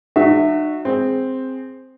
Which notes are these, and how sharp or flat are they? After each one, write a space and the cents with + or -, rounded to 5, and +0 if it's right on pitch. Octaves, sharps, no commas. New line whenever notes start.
D#4 -45 F#4 -5 E5 +0
C4 +0 G#4 +0